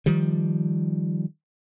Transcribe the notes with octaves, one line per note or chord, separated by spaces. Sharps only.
D#3 F3 G3